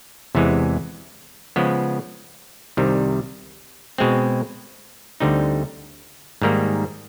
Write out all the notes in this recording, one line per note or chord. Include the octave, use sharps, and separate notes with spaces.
E2 C3 E3 G#3
C#3 F3 G#3 B3
C2 C3 D#3 G3
B2 G#3 C4
D2 D3 G3 C4 D#4
G#2 D#3 G3 A#3